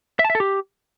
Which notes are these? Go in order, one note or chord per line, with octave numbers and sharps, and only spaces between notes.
E5
A5
E5
A4
G4